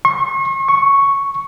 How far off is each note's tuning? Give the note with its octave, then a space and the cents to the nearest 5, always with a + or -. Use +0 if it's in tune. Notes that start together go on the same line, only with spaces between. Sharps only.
C#6 -40
C#6 +0